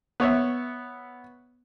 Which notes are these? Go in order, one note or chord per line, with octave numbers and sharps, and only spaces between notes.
B3 C#5 E5